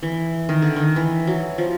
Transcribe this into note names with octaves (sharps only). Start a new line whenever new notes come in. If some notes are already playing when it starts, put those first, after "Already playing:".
E3
D#3
D3
D#3
E3
F#3
F3